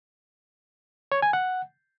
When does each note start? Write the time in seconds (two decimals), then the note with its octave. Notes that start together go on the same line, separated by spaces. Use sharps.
1.12 C#5
1.22 G#5
1.33 F#5